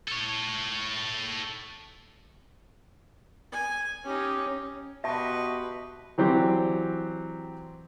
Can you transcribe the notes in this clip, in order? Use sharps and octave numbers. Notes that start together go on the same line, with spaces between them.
A4 C#5
G#5
C#4 D#4 G4
B2 G4 B4 D#5 E5 A5 C6 C#6
E3 F#3 C4 G4 D5